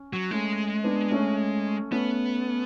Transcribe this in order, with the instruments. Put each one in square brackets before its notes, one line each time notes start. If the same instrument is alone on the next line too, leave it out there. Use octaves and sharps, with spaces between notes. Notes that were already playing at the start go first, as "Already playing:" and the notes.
Already playing: [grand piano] C#4
[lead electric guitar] F#3
[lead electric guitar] G#3 [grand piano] A3 C#4
[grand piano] B3 D4
A3 C#4
[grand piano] A3 C#4 [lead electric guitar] B3